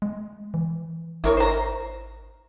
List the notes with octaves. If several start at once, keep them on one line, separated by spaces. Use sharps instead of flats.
G#3
E3
G#1 E4 A#4 C#5
C5 A#5